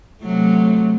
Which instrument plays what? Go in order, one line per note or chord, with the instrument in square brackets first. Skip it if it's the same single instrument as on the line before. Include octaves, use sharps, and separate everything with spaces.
[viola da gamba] C3 F#3 A3